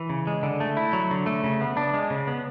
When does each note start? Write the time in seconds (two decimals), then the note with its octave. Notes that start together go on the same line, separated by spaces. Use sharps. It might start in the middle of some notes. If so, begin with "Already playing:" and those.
Already playing: E3
0.10 C#3
0.27 G#3
0.43 D3
0.60 A3
0.77 E4
0.93 F#3
1.11 D3
1.26 A3
1.44 C#3
1.61 B3
1.77 D4
1.94 G#3
2.10 C#3
2.27 B3